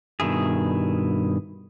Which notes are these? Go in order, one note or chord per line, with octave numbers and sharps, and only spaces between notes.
G2 B2 D#3 E4 G#4